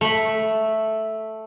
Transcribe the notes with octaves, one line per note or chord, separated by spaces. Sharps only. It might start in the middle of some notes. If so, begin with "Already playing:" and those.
A3 B5